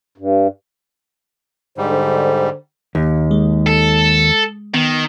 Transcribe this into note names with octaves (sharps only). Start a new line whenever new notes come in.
G2
G#2 D3 G3 C5
D#2
G#3
A4
D#3 B3